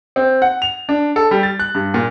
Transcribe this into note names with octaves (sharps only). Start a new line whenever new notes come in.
C4
F#5
F7
D4
A4
G3
A6
F#6
G2
A#2